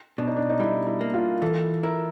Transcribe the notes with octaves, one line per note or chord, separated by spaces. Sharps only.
B2 D4
D#4
D4
D#4
G3 E4
E4
A#3
F4
E3 A4
E4 A#4